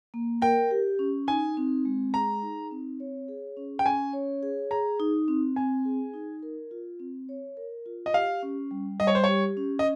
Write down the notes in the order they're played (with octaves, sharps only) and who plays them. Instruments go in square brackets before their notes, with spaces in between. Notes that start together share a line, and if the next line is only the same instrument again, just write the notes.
[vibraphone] A#3
[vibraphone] A#4 [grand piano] G5
[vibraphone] G4
C#4
[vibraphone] D#4 [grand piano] G#5
[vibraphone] C4
G#3
[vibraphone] G#4 [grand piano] A#5
[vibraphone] D#4
C4
C#5
G#4
C#4
[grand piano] G5
[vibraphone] C#4 [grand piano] G#5
[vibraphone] C#5
G#4
[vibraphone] G#4 [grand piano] A#5
[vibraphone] D#4
C4
[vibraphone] C4 [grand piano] G#5
[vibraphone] G#4
D#4
A#4
F4
C4
C#5
A#4
F4
[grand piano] D#5
[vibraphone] G4 [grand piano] F5
[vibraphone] C#4
G3
[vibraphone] G3 [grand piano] D#5
[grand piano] C#5
C5
[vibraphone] G4 [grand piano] C#5
[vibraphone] C#4
[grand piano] D#5